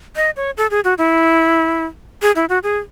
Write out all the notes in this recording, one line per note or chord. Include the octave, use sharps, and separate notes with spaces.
D#5
C#5
A4
G#4
F#4
E4
G#4
E4
F#4
G#4